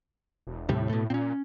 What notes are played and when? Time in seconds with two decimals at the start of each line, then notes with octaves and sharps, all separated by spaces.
0.47 E1
0.69 D#2 A2 C3 G3
0.90 B2 A3
1.10 A#2 C4 C#4